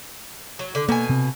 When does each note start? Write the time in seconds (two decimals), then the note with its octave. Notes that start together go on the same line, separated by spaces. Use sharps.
0.59 F#3
0.75 D3
0.89 B2 A#3 G#5
1.09 C3 C4